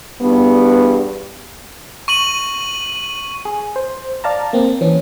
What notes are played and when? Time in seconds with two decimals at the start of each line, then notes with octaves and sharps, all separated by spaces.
0.21 E2 G2 B3
2.08 C#6 D#7 F#7
3.45 G#4
3.76 C5
4.24 D5 F5 A5 A#5
4.53 A#3 C4
4.81 E3 C#4